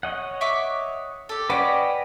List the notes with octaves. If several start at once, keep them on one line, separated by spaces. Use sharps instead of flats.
C#5 D#5 F#5
E5 C#6 D6
G4 A4
C#4 F#4 G4 B4 D5 D#5